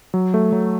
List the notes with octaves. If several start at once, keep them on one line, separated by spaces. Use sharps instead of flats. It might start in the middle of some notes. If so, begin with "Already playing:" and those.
F#3
A3
F#3